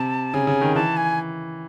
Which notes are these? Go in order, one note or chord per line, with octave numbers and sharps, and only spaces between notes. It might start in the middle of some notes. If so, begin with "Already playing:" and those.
Already playing: C3 A5
C#3 G#5
C#3
D#3
E3 A5
G#5